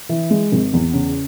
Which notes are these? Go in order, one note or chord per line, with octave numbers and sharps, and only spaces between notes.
E3
G#3
G#1
E2
C#3